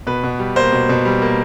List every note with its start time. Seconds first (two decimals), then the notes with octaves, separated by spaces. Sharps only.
0.07 B2 B4
0.24 B2
0.39 G3
0.56 A#3 C5
0.72 B2
0.89 B2
1.05 G3
1.22 A#3